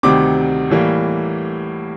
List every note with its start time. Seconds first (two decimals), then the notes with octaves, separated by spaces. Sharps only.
0.03 D2 C3 D#3 G3 C4 D6
0.70 A2 E3 G3 A#3